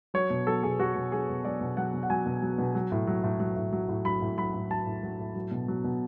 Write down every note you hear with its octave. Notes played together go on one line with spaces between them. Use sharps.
F#3 C#5
B2
F#3 A4
B2 G#4
F#3 F#4
B2
F#3 G#4
B2
F#3 D5
B2
F#3 F#5
B2
F#5
F#3 G#5
B2
F#3
B2
F#3
A2
F#3
A2
F#3
A2
F#3
A2
F#3 B5
A2
F#3 B5
A2
F#3 A5
A2
F#3
A2
F#3
B2
F#3
B2